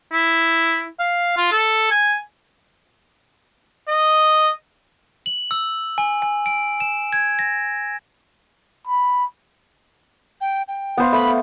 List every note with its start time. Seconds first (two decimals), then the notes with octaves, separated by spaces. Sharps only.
0.12 E4
0.99 F5
1.37 F4
1.52 A4
1.91 G#5
3.89 D#5
5.26 F#7
5.51 E6
5.98 G#5
6.22 G#5
6.46 D7
6.80 E7
7.13 G#6
7.39 A#6
8.87 B5
10.41 G5
10.68 G5
10.97 B3 C5 F5
11.13 A3 B5